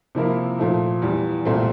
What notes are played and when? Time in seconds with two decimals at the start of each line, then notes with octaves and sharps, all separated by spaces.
0.15 C3 F3 A#3 E4 A#4
0.59 A#2 F3 A3
1.02 E2 E3 G3
1.45 C2 A#2 A3 C4